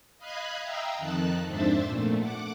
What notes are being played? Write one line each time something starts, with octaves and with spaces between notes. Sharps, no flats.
D#5 F5 B5 D#6 F#6 G#6
E5 F5 G5 A#5 D#6 E6
F2 D#3 D#4 A5 F#6
F2 G#2 D4 C5 E5 A6
A#2 A3
F#5 D6